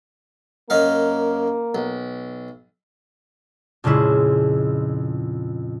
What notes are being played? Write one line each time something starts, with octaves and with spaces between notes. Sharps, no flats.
F#2 A#3 D#4 F5
B1
F2 A#2 C#3 G#3 E4